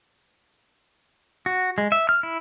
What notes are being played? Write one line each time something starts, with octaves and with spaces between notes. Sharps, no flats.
F#4
G#3
E5
F6
E4